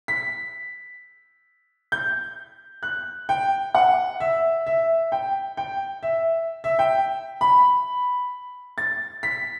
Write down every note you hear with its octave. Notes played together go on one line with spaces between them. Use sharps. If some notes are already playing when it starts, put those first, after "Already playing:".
B6
G6
F#6
G5
F#5
E5
E5
G5
G5
E5
E5
G5
B5
A6
B6